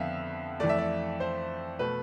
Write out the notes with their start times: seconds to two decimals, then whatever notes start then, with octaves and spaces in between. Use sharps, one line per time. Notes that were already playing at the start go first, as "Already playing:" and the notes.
Already playing: F2 D3 B3 E5 F5
0.60 F2 E3 A3 D5
0.69 E5
0.78 D5
1.20 C5
1.79 B2 A3 B4